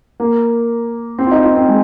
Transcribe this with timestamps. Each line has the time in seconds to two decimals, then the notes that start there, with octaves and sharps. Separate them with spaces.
0.20 A#3
1.19 C4
1.27 F4
1.32 D#4
1.44 F4
1.56 C4
1.69 G#3